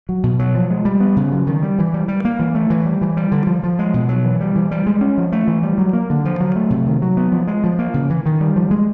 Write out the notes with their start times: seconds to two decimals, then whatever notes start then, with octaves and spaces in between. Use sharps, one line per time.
0.09 F#3
0.23 B2
0.39 F#3
0.55 F3
0.70 G#3
0.85 G3
1.00 B3
1.17 C#3
1.32 F#3
1.47 D#3
1.63 G3
1.79 E3
1.94 G3
2.08 G3
2.25 A#3
2.39 E3
2.54 A3
2.70 E3
2.85 G3
3.01 E3
3.17 G3
3.32 D3
3.47 F3
3.63 F3
3.79 G#3
3.94 B2
4.09 F#3
4.25 E3
4.41 G3
4.56 E3
4.71 G3
4.86 G#3
5.01 C#4
5.18 F3
5.32 A3
5.48 E3
5.63 G3
5.78 F#3
5.93 A#3
6.10 D3
6.25 F3
6.41 F#3
6.56 A3
6.70 C3
6.87 D#3
7.02 F#3
7.17 B3
7.32 F3
7.47 G#3
7.64 F3
7.79 A#3
7.94 C#3
8.10 E3
8.26 D#3
8.41 G3
8.56 F3
8.71 G#3